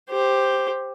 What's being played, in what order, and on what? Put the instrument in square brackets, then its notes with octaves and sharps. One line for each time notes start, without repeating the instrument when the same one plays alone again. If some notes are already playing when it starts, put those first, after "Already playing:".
[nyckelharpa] G4 C5